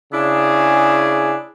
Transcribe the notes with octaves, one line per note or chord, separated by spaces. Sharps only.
C#3 D4 E4 G#4